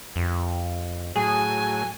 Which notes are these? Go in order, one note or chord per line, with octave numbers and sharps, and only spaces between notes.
F2
A2 F#3 G#4 G#5